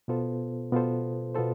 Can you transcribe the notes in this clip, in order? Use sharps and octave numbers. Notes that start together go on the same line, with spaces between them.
B2 B3 F4 A4 C5
B2 B3 F4 A4 C5
B2 B3 F4 A4 C5